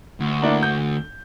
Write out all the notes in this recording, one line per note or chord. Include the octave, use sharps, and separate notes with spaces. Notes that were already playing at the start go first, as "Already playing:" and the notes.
D2
A#3 D4 E4
G6